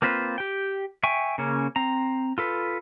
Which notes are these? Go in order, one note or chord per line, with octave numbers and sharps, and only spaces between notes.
A#3 C4 F4 B4 C5
G4 G5
E5 G5 G#5 C#6
C#3 A#3 C#4
C4 A#5
F4 A4 B4